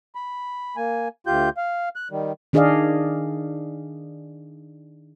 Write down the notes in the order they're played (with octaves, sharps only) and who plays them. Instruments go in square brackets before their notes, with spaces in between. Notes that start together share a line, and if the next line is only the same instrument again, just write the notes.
[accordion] B5
A#3 G#5
D2 F4 G4 G6
F5
F#6
D#3 G3
[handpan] D#3 D4 G#4 D5 D#5 F5